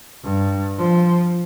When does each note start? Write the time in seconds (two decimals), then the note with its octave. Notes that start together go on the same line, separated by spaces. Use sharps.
0.23 G2
0.78 F3